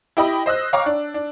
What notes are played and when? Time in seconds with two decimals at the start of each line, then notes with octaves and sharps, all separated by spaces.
0.17 E4 G4 D#5 B5 D#6
0.46 C5 D#5 E6 F#6
0.73 C#5 F5 G5 A#5 C#6 D6
0.86 D4
1.14 D4